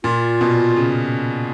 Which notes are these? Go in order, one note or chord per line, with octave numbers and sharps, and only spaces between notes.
A#2 F4
B2
C#3